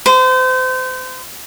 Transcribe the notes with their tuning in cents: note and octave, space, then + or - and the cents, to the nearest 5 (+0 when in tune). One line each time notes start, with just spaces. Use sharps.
C5 -35